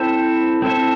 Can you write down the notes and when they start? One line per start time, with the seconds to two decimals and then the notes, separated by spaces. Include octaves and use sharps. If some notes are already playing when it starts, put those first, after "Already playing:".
Already playing: C4 E4 A4 C5 E5
0.62 C4 E4 A4 C5 E5